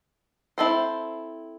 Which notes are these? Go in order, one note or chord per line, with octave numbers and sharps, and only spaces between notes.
C4 E4 A4 C5